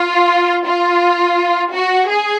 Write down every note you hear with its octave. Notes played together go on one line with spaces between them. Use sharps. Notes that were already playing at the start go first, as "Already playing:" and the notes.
Already playing: F4
F4
F#4
G#4